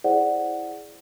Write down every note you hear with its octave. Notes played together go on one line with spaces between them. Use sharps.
E4 G#4 C5 D5 F#5